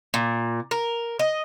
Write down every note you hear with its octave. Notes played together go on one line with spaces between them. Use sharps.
A#2
A#4
D#5